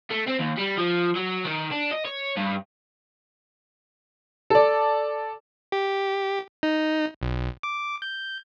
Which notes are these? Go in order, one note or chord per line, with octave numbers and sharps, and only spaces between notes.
A3
C4
D#2
G3
F3
F#3
D#3
D4
D#5
C#5
G2
A4 D5
G4
D#4
B1
D6
G6